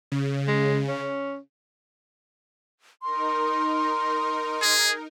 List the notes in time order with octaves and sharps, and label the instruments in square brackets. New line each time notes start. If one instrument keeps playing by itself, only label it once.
[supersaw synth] C#3
[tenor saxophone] G#3
C#4
[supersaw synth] D#4 A#4 [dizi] C6
[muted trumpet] G#4